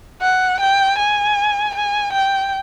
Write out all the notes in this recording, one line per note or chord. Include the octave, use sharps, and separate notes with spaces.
F#5
G5
G#5
G#5
G5